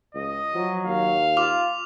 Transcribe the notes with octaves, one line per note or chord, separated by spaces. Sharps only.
C#2 D#5
F3 F#3
D#2 F5
F4 D6 F6 F7